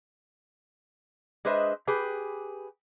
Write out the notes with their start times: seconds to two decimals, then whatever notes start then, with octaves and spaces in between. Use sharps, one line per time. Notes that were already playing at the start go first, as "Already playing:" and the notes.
1.45 G#3 D4 B4 C5 D#5 E5
1.87 G4 G#4 B4